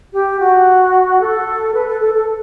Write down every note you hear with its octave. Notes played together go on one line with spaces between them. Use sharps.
G4
F#4
A4
B4
A4
A4
A4